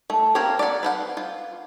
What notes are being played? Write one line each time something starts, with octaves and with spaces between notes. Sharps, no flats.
A3
A#3 C4 A#4 C5 C#5
D5 F#5
B4 C5 F#5
F4